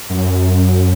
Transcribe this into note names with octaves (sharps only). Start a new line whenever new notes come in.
F#2